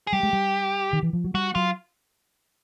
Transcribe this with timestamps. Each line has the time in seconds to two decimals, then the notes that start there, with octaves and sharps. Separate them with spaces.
0.07 G#4
0.13 G3 G4
0.23 G#3
0.33 G3
0.93 D#3
1.03 E3
1.13 F3
1.24 F#3
1.34 G3 F#4
1.55 F#3 F4